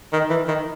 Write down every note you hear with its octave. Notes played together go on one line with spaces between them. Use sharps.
D#3
E3
D#3